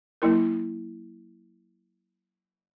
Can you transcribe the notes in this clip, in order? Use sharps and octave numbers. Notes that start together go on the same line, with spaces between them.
F#3 A#3 E4 A#4